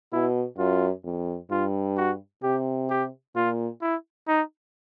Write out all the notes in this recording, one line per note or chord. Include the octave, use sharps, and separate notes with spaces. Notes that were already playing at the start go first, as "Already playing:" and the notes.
B2 E4
F#2 F4
F2
G2 F4
F#4
C3 G4
G4
A#2 F4
E4
D#4